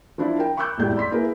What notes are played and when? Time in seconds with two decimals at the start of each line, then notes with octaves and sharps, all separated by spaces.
0.18 F3 D4 E4
0.37 A#4 G5
0.57 B5 C#6 D6 E6 F#6 G6
0.78 E1 F2 A2 G4 G6
0.96 D5 B5 C6 B6
1.11 A#3 E4 G#4 A#4 B4